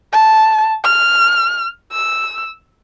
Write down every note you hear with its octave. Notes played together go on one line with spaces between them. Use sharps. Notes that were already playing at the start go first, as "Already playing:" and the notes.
A5
F6
E6